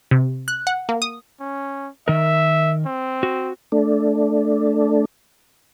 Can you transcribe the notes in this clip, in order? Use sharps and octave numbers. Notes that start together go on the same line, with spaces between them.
C3
F#6
F#5
A#3
D#6
C#4
D#3 A#4 E5
C4
F#4
A3 D4